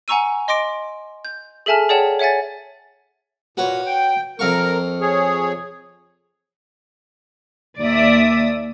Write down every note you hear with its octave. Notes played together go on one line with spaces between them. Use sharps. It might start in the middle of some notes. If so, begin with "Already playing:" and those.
F#5 G#5 A#5 C#6 E6 D#7
D#5 C6 D6 A#6 D7
G6
G#4 A4 E5 G#5 A5 F6
G#4 C#5 D5 F#5 G5 A5
C#5 E5 F#5 G#5 A6
A#2 F#4 B4 C#5
G5
F2 A#4 F5 C#6
G#4 C#5
D#2 D5 E5 D#6